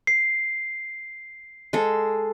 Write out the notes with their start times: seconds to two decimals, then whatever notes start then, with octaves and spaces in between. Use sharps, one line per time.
0.07 C7
1.73 G#3 A4